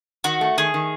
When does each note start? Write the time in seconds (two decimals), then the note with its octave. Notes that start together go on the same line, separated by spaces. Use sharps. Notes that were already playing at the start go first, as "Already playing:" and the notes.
0.24 D#3 F#4
0.41 A3
0.57 D#3 G#4
0.74 D#3